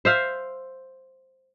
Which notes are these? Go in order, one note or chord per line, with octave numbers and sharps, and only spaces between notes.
C5 E5 F5